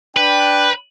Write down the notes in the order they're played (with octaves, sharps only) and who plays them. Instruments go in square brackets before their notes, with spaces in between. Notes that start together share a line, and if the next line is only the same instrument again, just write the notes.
[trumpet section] D4 G5 [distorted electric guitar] B4